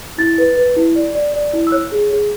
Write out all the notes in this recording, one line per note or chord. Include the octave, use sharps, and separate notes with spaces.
E4 A6
B4
B4
E4
D5
D5
D5
E4
E6
C#5 F#6
G#4
G#4